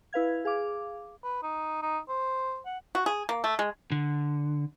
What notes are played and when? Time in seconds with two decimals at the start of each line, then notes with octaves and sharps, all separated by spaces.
0.13 E4 B4 F5 G#6
0.45 G#4 F5 D6
1.24 B4
1.43 D#4
1.82 D#4
2.09 C5
2.66 F#5
2.95 F#4
3.06 G#4
3.29 A#3
3.44 A3
3.59 G#3
3.92 D3